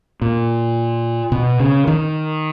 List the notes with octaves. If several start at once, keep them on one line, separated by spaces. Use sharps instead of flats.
A#2
B2
C#3
D#3